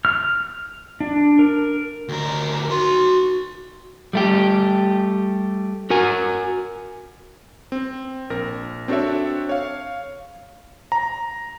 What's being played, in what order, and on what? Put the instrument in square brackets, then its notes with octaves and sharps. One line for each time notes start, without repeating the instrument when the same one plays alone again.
[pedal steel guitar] F6
D4
A#4
[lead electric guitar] D2 A#4
F#4 C6
[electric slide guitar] G3 A3 G4
F#4 A#4 G#5
[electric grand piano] C4
A#1 A#4 A#6
C4 D4 F#4 A4 C#5 E5
C#5 F5
A#5